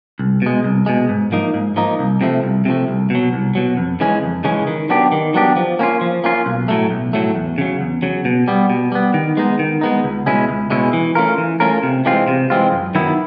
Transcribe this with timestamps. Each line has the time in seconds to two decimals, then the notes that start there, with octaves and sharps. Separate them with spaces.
0.19 C2
0.42 B2 G#3
0.64 C2
0.86 B2 G#3
1.09 G#2
1.32 F3 A#3 D#4
1.54 G#2
1.76 F3 A#3 D#4
1.99 C2
2.21 C3 F3 A3
2.44 C2
2.65 C3 F3 A3
2.88 C2
3.10 B2 F#3
3.33 C2
3.55 B2 F#3
3.77 F2
4.00 C#3 E3 G#3 C#4
4.23 F2
4.44 C#3 E3 G#3 C#4
4.67 D#3
4.89 F#3 B3 D4 G4
5.12 D#3
5.34 F#3 B3 D4 G4
5.56 F3
5.79 A#3 C#4 F4
6.01 F3
6.24 A#3 C#4 F4
6.46 B1
6.68 A2 F#3 A3
6.91 B1
7.13 A2 F#3 A3
7.35 E2
7.58 C#3 F#3
7.81 E2
8.02 C#3 F#3
8.25 B2
8.48 G3 B3
8.70 B2
8.92 G3 B3
9.14 D#3
9.37 G#3 B3 D#4
9.59 D#3
9.81 G#3 B3 D#4
10.04 C#2
10.26 B2 G#3 C#4 E4
10.49 C#2
10.70 B2 G#3 C#4 E4
10.93 E3
11.15 A3 C#4 F4 A#4
11.38 E3
11.60 A3 C#4 F4 A#4
11.83 C3
12.05 E3 G#3 C4 F4
12.28 C3
12.50 E3 G#3 C4 F4
12.72 F#2
12.95 D#3 F#3 B3 E4